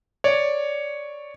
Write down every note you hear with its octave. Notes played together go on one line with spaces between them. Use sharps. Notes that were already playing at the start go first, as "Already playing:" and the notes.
C#5 D5